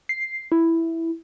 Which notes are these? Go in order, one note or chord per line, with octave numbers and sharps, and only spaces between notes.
C7
E4